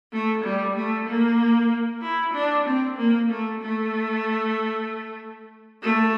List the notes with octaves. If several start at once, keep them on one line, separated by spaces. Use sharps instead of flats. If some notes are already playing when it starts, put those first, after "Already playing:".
A3
G3
A3
A#3
E4
D4
C4
A#3
A3
A3
A3